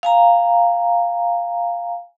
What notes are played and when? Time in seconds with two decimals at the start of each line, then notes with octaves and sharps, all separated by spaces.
0.03 F5 G#5 A#5